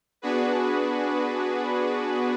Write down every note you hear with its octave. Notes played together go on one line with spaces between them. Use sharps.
B3 D4 F#4 G#4 B4